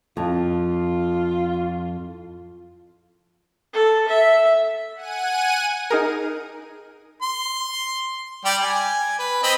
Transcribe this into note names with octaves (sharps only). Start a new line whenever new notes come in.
F2 F4
A4
E5
F#5 G#5 D#7
D#4 G#4 A#4
C6
G3 G4 D5
G#5
B4
C4 D#5 B5